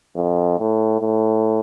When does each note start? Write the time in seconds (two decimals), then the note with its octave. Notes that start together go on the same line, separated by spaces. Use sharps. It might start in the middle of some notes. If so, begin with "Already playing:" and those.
0.16 F2
0.59 A2
1.00 A2